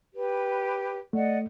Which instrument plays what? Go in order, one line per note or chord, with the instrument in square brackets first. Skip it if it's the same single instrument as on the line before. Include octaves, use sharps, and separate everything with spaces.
[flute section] G4 B4 C#5
[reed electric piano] A3 [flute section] D5 D#5 F#5